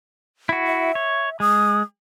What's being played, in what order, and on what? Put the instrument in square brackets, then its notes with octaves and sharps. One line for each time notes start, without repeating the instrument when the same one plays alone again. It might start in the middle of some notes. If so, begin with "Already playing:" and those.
[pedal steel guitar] E4 F#4
[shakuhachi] E5
[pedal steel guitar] C#5
[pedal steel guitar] G#3 [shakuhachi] D#6